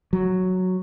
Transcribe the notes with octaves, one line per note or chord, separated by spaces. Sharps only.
F#3